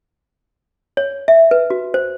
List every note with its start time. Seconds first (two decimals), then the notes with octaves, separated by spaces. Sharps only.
0.97 C#5
1.28 E5
1.51 B4
1.70 F#4
1.94 C5